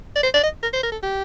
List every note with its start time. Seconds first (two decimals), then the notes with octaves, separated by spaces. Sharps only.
0.16 D5
0.23 C5
0.34 D5
0.43 D#5
0.63 A#4
0.74 C5
0.83 A#4
0.92 A4
1.03 G4